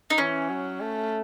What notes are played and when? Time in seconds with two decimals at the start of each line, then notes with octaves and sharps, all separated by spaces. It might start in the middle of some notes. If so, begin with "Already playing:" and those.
0.10 D#4
0.18 E3 C#4
0.49 F#3
0.80 A3